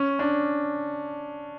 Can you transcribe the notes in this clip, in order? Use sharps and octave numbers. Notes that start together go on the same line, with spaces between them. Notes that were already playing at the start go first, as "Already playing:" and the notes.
Already playing: C#4
D4